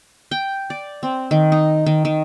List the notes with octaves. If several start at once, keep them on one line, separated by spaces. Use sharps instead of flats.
G5
D5
C4
D#3
D#4
D#3
D#3